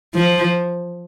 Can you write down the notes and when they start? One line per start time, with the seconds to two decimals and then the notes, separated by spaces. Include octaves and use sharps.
0.15 F3